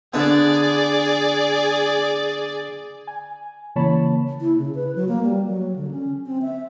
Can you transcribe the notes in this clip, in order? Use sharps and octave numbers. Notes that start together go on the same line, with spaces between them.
D3 B3 G#4 D5
G#5
C#3 E3 A#3 C#5 A5 B5
E4
C#3
B4
F#3
A#3
G3
F#3
D3
C#4
C4
E5